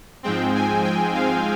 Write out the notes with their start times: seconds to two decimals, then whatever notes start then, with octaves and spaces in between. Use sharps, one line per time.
0.23 G#2 F3 G#3 C4 G5
0.55 G#5
0.84 G5
1.15 F5